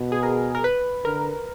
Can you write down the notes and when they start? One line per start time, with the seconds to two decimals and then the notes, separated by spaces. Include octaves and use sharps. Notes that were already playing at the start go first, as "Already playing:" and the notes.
Already playing: B2 B4
0.12 G#4
0.23 A#4
0.55 A#4
0.64 B4
1.04 D3 A#4